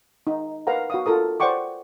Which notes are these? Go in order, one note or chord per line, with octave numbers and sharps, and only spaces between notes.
D#4
A#4 B4 F5 F#5 A#5
F#4 F5 D#6
F4 A4 A#4 D#6
C5 D5 F#5 G5 C#6 D6